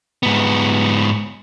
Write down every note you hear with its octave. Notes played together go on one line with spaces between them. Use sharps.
G#2 B3